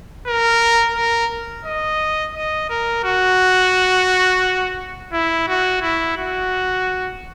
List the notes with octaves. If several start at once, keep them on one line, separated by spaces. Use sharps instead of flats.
A#4
A#4
D#5
D#5
A#4
F#4
E4
F#4
E4
F#4